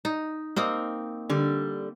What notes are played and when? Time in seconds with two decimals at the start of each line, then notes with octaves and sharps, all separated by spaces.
0.05 D#4
0.56 A#3 C4 D#4
1.30 D3 G3